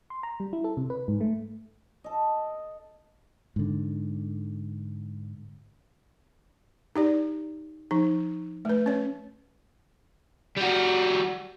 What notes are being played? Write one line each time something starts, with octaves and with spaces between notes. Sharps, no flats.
C6
A#5
G3
E4
A4
C3
B4
G#2
A3
A4 D#5
G#2 D3
D#4 G4 D5
F3 D#4
A3 B4
C#4 C#5
G3 F#4